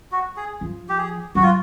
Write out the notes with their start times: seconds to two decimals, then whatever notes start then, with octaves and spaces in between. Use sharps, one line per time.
0.12 F#4
0.37 G#4
0.61 F3
0.89 G4
0.98 G#4
1.35 F#3 F#4
1.43 F4